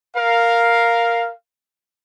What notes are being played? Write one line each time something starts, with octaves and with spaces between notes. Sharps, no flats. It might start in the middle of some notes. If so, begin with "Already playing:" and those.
A#4 F5